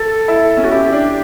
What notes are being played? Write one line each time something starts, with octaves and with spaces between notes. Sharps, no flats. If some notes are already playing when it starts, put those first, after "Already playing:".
Already playing: A4
E4
C#4
F#4
E4 G4
D4